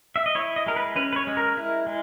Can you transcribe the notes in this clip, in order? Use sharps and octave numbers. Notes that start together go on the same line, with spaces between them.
E5
D#5
E4 C#5
D#5
G#3 A#4
B4
C#4 B4
B4
C#5
G#3
A#4
E4
G#3